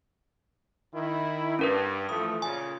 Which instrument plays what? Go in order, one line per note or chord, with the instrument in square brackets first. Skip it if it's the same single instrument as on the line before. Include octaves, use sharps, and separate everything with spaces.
[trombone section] D#3 E4
[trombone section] G2 [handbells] C#4 A#4 B4
[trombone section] E3 F3 A3 [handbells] D#6
[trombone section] A#2 C#3 [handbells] G#5